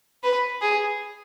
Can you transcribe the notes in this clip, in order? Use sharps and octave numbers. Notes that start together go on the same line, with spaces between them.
B4
G#4